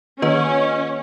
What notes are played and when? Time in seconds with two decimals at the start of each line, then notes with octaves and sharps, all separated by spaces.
0.22 D#3 A#3 C#4 F4 B4 D#5